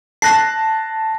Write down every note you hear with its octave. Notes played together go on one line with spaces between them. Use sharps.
A5 F#6 A#6 C7